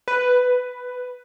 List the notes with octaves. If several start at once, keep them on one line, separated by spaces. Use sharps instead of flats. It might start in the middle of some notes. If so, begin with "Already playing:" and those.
B4